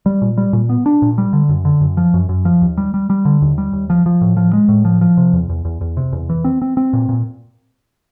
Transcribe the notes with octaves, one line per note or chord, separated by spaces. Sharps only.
G3
A#2
G3
A#2
B3
D4
A#2
G3
D3
F#2
D3
F#2
F3
F#2
F#2
F3
D#2
G3
G3
G3
D3
D#2
G3
D#2
F3
F3
A2
F3
G#3
A2
F3
F3
C3
E2
E2
E2
E2
C3
E2
E3
C4
C4
C4
A#2
A#2